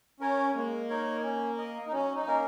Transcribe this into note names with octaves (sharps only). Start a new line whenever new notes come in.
C#4 A#4 C#5
G#3 A#3
D#4 A#4 C#5
C#4
A#4 D#5
D#4
F#3 C#4
D#4
A#3 C#4 A#4